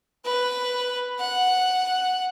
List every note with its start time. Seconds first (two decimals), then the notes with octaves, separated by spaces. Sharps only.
0.25 B4
1.19 F#5